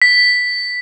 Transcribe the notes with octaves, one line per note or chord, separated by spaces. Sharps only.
B6